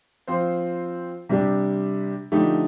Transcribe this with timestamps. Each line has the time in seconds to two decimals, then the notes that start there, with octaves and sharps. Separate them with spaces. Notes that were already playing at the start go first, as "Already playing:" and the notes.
0.27 F3 C4 F4 C5
1.29 C3 G3 D4 G4
2.32 D3 F3 A3 D#4 G4